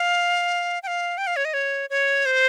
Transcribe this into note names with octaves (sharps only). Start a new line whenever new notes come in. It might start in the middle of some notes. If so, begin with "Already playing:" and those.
Already playing: F5
G5
F5
G5
F5
C#5
D#5
C#5
C#5
C5